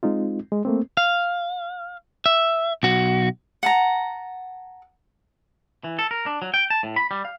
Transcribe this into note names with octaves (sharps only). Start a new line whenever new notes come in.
G#3 C4 D#4 F4
G#3
A3 A#3 C4
F5
E5
B1 F#4
F#5 A5 A#5
E3
A4
A#4
D4
F#3
G5
A5
A2
B5
G3
F5